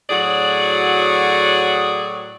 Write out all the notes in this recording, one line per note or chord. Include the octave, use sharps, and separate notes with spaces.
A2 F#3 F#4 G#4 D5